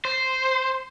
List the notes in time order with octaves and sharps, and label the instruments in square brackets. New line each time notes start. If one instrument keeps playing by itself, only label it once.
[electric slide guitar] C5